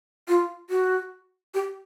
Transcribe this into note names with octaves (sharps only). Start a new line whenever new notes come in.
F4
F#4
G4